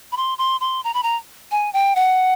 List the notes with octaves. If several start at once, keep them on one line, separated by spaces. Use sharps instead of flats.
B5
C6
C6
C6
A#5
B5
A#5
G#5
G5
F#5